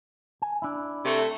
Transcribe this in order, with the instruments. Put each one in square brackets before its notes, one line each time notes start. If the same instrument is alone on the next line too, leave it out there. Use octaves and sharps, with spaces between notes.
[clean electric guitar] G#5
D4 E4
[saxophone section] C3 A3